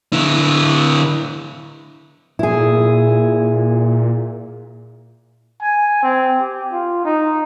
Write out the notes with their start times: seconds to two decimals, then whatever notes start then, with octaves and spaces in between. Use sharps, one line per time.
0.13 D3 E4
2.39 A#2 E4 G#4
5.61 G#5
6.03 C4
6.41 G4
6.72 F4
7.05 D#4